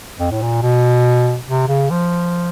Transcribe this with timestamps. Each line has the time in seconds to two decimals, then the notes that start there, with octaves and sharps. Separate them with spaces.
0.20 F2
0.31 A2
0.42 A#2
0.62 B2
1.48 C3
1.68 C#3
1.90 F3